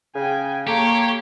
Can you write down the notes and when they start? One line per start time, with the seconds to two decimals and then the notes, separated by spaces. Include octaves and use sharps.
0.15 C#3 G5 G#5
0.67 A#3 G4 A4 C#5